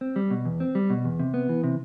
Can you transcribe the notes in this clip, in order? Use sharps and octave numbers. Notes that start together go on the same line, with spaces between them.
C4
G3
B2
E2
C4
G3
B2
E2
C3
B3
E3
C3